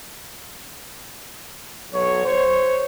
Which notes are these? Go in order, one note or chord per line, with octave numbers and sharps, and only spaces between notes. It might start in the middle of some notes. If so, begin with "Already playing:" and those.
B1 F#3 C#5
C5 C#5